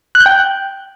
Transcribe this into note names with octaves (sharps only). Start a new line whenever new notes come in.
F#6
G6
G5